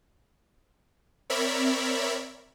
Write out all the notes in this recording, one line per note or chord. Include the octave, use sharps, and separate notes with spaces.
C4 A#4 C#5 D5 E5 B5